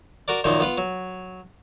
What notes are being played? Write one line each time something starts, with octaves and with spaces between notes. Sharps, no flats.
F#4 A#4 D5
F#2 A#2 D#3 F3 D#4
B3 F4 B4
F#3